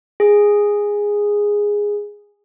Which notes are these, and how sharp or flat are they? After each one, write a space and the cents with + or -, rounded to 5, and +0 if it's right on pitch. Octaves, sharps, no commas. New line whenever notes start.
G#4 -10